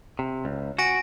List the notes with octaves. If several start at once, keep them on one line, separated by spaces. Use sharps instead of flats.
C3
C#2
F#4 G#5 A#6 D7